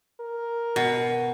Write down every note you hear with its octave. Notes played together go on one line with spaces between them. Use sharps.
A#4
B2